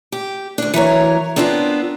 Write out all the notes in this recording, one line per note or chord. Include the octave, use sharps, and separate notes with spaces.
G4
D2 D4
E3 F#3 A#4 C#5
B3 C4 D4 F4 A#4